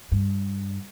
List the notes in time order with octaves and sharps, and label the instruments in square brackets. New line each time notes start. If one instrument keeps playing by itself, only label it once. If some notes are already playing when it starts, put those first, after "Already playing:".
[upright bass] G2